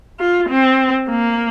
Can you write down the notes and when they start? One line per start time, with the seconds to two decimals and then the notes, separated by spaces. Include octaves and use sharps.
0.20 F4
0.49 C4
1.09 A#3